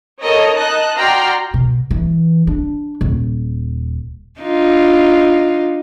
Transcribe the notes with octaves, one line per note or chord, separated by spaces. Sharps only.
A4 A#4 C#5 D#5 A#5
D#4 D#5 A5 F#6
F#4 D5 G5 A#5 C6 F6
B2
E3
D4
D#1
D4 D#4 F4